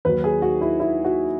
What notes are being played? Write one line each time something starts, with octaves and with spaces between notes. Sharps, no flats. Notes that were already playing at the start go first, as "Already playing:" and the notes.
D#2 D#3 F#3 B4
G#4
F#4
E4
E4
F#4